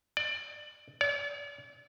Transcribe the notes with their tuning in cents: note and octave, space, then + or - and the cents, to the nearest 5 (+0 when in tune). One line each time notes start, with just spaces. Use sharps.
D5 +20
D5 -45